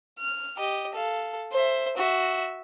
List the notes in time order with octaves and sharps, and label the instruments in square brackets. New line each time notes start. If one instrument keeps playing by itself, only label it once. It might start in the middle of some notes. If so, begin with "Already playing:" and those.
[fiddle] F6
G4 D#5
A4 F5
C5 E5
F#4 E5